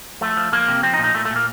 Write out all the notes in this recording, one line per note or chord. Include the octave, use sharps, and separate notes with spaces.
F3 A3
F3
F3 A#3
C3
F3 C4
D#4
A#2
D#4
A#2 A3
A3
A#2
A#3